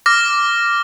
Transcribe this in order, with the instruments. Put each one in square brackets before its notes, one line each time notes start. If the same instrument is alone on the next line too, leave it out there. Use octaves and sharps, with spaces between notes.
[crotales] D6 F6 A#6